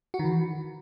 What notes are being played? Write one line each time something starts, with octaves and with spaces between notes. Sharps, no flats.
F#4
D#3
E3